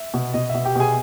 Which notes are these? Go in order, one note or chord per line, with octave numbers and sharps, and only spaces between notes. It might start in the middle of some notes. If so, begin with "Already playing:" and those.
Already playing: E5
B2
B2 D#5
B2 E5
G4 G5
B2 G#4 G#5